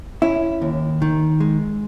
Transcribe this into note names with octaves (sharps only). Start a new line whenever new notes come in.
C#4 E4
D#2
D#3
G#3